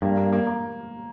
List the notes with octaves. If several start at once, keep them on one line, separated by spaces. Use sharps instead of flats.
G2 A#3
A#3
A#3
A#3